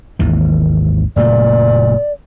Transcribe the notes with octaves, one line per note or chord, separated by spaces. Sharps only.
G#1 D#2 E3
F#1 A#2 A3 D5